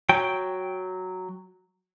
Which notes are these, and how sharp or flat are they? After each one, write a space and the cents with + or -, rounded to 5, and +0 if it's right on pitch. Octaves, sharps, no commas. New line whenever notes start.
F#3 +0 G5 +0